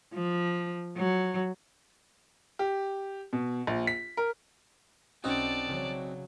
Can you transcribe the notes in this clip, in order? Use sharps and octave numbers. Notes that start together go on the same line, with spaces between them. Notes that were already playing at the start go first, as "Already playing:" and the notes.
F3
F#3
G4
B2
A#1
B6
A#4
B1 C4 C#4 D#4 F#4 D5 A5
C#3 F#3